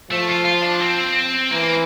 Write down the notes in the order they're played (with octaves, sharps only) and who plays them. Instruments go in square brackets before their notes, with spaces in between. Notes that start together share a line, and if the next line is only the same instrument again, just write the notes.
[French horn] F3 [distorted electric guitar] A3
[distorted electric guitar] F4
F4
D4
C4
[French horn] E3 [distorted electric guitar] A#3